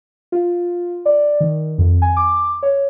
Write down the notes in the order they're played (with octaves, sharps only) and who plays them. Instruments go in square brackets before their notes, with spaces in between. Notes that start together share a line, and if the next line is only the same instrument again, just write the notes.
[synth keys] F4
D5
D#3
F2
G#5
D6
C#5